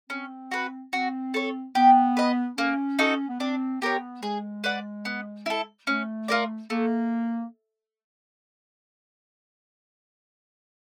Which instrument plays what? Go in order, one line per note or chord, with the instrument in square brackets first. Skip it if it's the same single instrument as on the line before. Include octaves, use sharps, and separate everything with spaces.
[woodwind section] C4 [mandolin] C#4
[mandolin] F#4 B4
[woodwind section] C4 [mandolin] F#4
[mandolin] A4 C#5
[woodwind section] B3 [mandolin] G4
[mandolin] B4 D#5
[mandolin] A#3 [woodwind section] C#4
[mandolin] D#4 F#4 A4
[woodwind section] B3
[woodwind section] C4 [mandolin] D4
[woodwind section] B3 [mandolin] G4 A#4 C#5
[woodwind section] G#3 [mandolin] G#4
[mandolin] B4 D5 F#5
B3
E4 A4
[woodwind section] A3 [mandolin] C#4
[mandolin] F4 A#4 D5
[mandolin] A3 [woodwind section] A#3